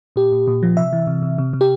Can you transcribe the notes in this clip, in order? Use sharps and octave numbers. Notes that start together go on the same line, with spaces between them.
A#2 G4
A#2
A#2
F3
C3 E5
E3
C3
C3
C3
C3
G4